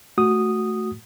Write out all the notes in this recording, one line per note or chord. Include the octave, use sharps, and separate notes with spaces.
A3 F#4 D#6